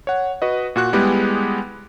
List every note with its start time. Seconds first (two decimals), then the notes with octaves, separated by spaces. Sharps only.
0.07 C#5 F#5
0.42 F#4 B4 D#5
0.76 A#2 F#4 F#6
0.93 G3 G#3 B3 E4 G4 G#4